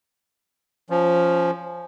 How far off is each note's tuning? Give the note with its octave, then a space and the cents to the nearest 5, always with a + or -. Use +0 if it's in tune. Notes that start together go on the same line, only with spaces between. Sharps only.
F3 +0 C#4 +10